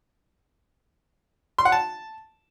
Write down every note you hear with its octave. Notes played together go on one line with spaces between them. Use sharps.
C6
F#5
A5